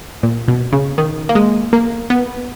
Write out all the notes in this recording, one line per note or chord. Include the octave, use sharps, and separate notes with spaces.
A#2
B2
C#3
D#3
A#3
G#3
A#3
B3